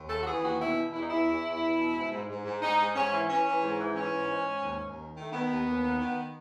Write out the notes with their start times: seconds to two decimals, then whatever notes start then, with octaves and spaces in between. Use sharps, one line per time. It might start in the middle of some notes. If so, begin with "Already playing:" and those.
Already playing: D#2
0.08 C#3 A4
0.21 F#4
0.26 E3 G#4
0.42 D#2 F#4
0.59 B2 E4
0.76 E2
0.93 E2 E4
1.01 D#4
1.10 E2 E4
1.27 E2
1.43 E2
1.61 E2
1.77 B2
1.94 G#2
2.11 G#2
2.28 G#2
2.45 G#2
2.61 G#2 D#4
2.78 G#2
2.95 G#2 C#4
3.12 E3
3.29 E3 C#4
3.45 E3
3.63 G#2
3.79 E3
3.96 E3 C#4
4.13 G#2
4.29 G#2
4.47 G#2
4.63 D#2
4.81 D#2
4.97 D#3
5.14 D#3 A3
5.31 D#3 B3
5.48 D#2
5.65 D#2
5.82 D#3
5.98 D#3